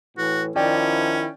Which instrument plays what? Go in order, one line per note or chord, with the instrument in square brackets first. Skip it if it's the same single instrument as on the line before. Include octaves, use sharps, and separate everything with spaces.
[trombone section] A2 E3 [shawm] F#4
[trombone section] D#3 F3 E4 [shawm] C#4 [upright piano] D5 G5